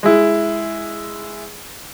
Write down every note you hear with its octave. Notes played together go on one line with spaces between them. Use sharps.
G#3 E4